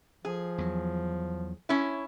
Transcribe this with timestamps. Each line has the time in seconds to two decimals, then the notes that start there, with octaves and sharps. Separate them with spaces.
0.25 F3 G#4
0.58 E2 F#3
1.69 C#4 E4